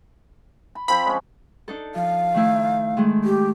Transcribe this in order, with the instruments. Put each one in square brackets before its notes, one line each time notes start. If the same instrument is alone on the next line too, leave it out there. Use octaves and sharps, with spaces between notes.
[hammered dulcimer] B5
[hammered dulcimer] F3 C4 C5 [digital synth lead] B5
[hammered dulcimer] G#3 C#4
[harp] D4 D#4 A4
[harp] F3 [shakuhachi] F5
[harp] D#3 A3 E4
D#3 G#3 A3
[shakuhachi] G4